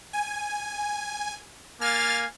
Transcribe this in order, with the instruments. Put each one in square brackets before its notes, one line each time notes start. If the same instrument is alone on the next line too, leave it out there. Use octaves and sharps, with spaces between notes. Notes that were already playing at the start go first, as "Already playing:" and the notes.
[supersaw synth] G#5
[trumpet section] A#3 F5 G#5 [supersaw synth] F6 A6